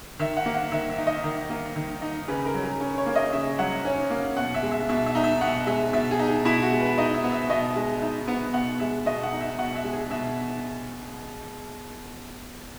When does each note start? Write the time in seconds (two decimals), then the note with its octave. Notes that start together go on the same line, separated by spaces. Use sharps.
0.20 D#3 E5
0.37 F#5
0.46 A#3
0.54 F#5
0.72 D#3 E5
0.89 E5
0.98 D#4
1.07 D#5
1.24 D#3
1.50 A#3
1.76 D#3
2.02 D#4
2.28 C#3 B4
2.45 A#4
2.54 F#3
2.63 G#4
2.80 C#4
2.98 C#5
3.06 A#3
3.15 D#5
3.33 C#3 E5
3.59 F#3 F#5
3.85 C#4
4.10 A#3
4.37 B2 F#5
4.54 E5
4.63 G#3
4.72 E5
4.89 B2 E5
5.06 E5
5.15 D#4
5.24 E5
5.41 B2 F#5
5.67 G#3 E5
5.93 B2 E5
6.11 G#4
6.19 D#4
6.28 G#4
6.45 B2 E4
6.63 F#4
6.72 G#3
6.80 B4
6.98 D#4 D#5
7.14 E5
7.24 B3
7.32 E5
7.49 B2 D#5
7.76 G#3
8.02 D#4 E5
8.28 B3
8.54 B2 F#5
8.80 G#3 E5
9.06 B2 D#5
9.23 F#5
9.32 D#4
9.41 E5
9.58 B2 F#5
9.75 E5
9.84 G#3
9.93 G#4
10.11 B2 E5